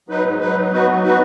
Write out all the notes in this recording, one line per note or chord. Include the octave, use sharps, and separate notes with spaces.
F#3 D#4 B4
G#2
F#3 D#4 B4
F#3
B3 D#4 F#4 B4
F#3
B3 D#4 F#4 B4